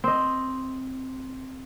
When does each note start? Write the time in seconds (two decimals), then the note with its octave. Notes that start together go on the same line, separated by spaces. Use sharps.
0.04 C4 D#5